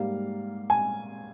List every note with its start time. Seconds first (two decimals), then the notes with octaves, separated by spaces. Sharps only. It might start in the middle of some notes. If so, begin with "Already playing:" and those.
Already playing: G#2 G3 A#3 F5
0.70 G#5